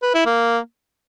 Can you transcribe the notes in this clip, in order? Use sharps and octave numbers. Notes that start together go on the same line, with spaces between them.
B4
E4
A#3